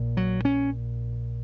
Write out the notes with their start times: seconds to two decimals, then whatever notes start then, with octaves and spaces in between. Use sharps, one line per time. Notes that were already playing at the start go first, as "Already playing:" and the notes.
Already playing: A#1 A#2
0.17 F#3
0.45 C#4